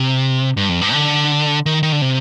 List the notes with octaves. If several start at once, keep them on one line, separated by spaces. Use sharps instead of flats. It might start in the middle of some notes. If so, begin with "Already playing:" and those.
Already playing: C3
G2
F2
G2
D3
D#3
D#3
D3
C3